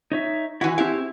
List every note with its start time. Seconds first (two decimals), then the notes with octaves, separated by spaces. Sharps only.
0.12 D#4 C#5 E5
0.61 E3 E4 F#4
0.78 C4 E4 G4 G#4